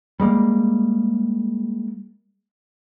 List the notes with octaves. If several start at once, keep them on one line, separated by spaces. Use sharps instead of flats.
G3 G#3 A#3